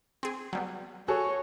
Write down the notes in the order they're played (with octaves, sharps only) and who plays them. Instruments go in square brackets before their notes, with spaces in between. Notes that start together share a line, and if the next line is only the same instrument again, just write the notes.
[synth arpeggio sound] C4 G#4
F#3 G3 B3
[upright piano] F#4 G#4 A4 [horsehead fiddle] C#5